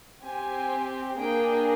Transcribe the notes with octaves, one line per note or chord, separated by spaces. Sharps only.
C4 G4 G#5
A#3 D4 G#4 G5